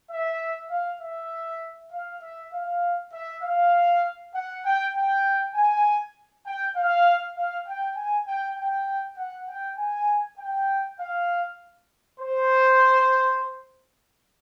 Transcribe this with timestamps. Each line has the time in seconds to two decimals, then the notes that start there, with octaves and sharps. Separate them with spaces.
0.11 E5
0.71 F5
1.01 E5
1.92 F5
2.22 E5
2.53 F5
3.13 E5
3.43 F5
4.35 F#5
4.65 G5
4.95 G5
5.55 G#5
6.45 G5
6.76 F5
7.37 F5
7.67 G5
7.96 G#5
8.28 G5
8.57 G5
9.18 F#5
9.48 G5
9.78 G#5
10.39 G5
10.99 F5
12.20 C5